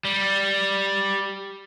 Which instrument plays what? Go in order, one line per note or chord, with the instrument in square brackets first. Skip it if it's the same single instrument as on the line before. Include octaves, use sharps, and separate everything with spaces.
[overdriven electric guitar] G3